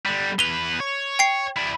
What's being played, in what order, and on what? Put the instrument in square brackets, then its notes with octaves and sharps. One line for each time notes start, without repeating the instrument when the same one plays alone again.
[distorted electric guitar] D3 G3
[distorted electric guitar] E2 B4 [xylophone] F7 G7
[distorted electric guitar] C#5
[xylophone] G5 C7
[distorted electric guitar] E4 D5